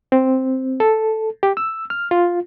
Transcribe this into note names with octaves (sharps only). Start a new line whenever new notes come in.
C4
A4
G4
E6
F6
F4